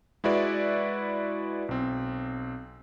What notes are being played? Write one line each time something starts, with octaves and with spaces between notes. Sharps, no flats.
G#3 E4 F#4 B4 D5 E5
B1 C4